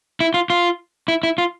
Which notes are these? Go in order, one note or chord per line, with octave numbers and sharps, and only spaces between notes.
E4
F4
F4
E4
E4
F4